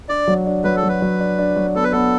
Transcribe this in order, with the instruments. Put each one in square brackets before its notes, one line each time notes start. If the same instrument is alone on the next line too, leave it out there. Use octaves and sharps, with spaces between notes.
[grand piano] D4 [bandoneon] D5
[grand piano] F#3
D4
[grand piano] F#3 [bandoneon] B4
[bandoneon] A4
[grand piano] F#3
[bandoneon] B4
[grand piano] F#3
D4
D4
F#3
[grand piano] B3 [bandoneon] A4
[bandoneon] B4
[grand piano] B3 [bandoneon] A4